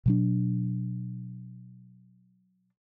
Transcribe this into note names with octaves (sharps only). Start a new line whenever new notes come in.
B2 F#3 D4